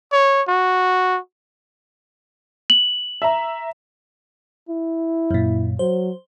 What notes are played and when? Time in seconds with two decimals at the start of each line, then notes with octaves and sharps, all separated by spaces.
0.12 C#5
0.48 F#4
2.70 F#7
3.22 E5 A#5
4.69 E4
5.31 F#2 A#2
5.79 F#3 C5